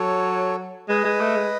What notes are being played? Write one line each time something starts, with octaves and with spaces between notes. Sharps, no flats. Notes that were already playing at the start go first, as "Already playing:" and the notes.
Already playing: F#3 A4 C#5
G#3 B4 D#5
G#3
A3
G#3